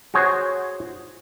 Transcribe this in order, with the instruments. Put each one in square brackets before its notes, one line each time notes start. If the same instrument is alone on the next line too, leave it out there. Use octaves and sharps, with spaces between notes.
[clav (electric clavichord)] F#4 G#4 C5 C#5